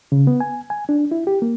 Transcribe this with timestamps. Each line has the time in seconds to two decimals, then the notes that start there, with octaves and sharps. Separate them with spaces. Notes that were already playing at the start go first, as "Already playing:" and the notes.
0.12 C#3
0.27 B3
0.40 G#5
0.70 G#5
0.89 D4
1.11 E4
1.27 G4
1.42 A#3